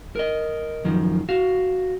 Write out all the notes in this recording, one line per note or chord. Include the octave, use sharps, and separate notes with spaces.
A#4 D#5
F#2 D#3 F3
F#4 F5